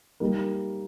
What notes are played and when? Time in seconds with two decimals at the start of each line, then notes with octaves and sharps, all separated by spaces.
0.20 G3 A#3 D#4 A#4